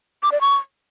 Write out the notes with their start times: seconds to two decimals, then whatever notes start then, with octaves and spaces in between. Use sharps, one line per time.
0.23 D6
0.32 D5
0.41 C#6